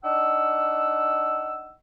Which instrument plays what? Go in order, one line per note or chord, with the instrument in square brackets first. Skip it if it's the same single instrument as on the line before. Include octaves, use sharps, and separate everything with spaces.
[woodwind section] D4 D#4 F#5 E6